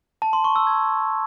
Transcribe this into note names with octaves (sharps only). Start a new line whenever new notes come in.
A5
C6
C#6
E6
G#6